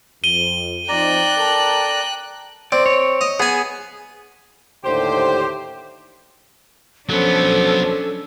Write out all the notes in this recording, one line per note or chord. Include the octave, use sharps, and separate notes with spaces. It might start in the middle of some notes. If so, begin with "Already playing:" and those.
F2 D#7 G7
F3 C4 D#4 D5 G5 A#5 F#6
A4 A#4 A5
C4 D5
C#5
D#5
B3 G#4 G#5
D#2 A2 D3 G4 C5
F3 F#3 B3 C#4 D4 A4